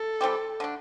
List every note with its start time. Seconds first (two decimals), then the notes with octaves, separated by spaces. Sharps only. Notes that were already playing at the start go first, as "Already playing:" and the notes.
Already playing: A4
0.21 E3 G3 C4 G4
0.60 D3 A3 D4